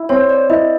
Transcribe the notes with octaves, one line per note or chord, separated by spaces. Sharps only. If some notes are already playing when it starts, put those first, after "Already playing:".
Already playing: E4
C4 C#5
D5
E4 D#5